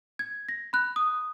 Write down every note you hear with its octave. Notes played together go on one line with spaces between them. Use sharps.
G#6
A#6
B5 F#6
D#6